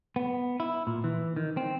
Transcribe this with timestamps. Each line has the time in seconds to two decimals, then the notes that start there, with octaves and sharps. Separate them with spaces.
0.16 B3
0.60 E4
0.87 A#2
1.04 E3
1.36 D#3
1.57 C4